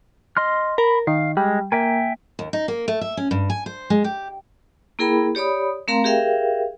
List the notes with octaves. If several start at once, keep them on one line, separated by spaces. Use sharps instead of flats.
D#5 C6 F6
A#4 B5
D#3 F5
G3 G#3
A#3 E5 G5 G#5
D#2
D#4
A#3
A3
E5
C#4
G2
G#5
C5
G#3
G4
A#3 E4 G#4 A#4 G5 B5
G4 C#5 D5 B5 D#6
A3 C4 A#4 F5 A#5 C6
G4 G#4 A#4 E5 F5 G5